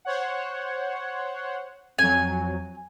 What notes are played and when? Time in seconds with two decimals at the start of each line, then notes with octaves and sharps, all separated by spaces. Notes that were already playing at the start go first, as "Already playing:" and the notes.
0.05 C5 C#5 F#5
1.98 F2 F#3 G#5